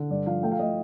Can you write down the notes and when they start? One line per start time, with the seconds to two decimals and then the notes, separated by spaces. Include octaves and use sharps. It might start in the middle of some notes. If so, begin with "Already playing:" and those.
Already playing: D3
0.10 G2 D5
0.26 F3 F5
0.43 A3 G5
0.52 F5
0.59 A3 D#5